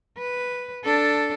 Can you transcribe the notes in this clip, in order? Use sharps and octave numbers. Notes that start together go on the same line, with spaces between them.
B4
D4 A4